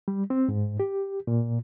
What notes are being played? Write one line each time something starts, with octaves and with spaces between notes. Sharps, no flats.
G3
C4
G#2
G4
A#2